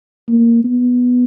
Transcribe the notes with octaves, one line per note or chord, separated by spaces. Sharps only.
A#3
B3